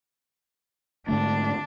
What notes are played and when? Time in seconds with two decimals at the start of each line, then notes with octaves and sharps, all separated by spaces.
1.09 G#2 D3 A3 D4